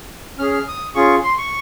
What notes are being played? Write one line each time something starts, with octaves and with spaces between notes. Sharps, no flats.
C#4 G#4 F6
F6
D#6
C#4 F4 G#4 C#6
C6
C#6